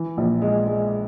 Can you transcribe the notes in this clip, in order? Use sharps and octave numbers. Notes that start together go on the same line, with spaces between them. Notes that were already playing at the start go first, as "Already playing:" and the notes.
Already playing: E3
A#1
G#3
G#3